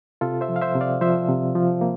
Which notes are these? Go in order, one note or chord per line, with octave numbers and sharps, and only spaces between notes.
C3 F4 A4
C5 E5
F3
F5
C5 E5
C3
D5 F5
F3 C5 E5
C3
F3
A#3